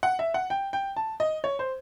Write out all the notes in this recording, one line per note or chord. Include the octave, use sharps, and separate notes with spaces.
F#5
E5
F#5
G5
G5
A5
D#5
C#5
C5